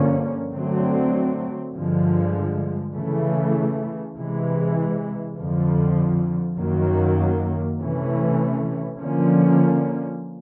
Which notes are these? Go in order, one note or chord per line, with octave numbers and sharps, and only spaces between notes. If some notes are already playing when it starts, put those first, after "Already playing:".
Already playing: G2 D3 F3 A#3 C#4
D3 F#3 A3 C4
G2 D3 F3 G#3
C#3 E3 A3
C3 E3 G#3
F2 D3 F3
F#2 D#3 F#3 A#3
C3 E3 A3 C#4
D3 F3 A#3 C#4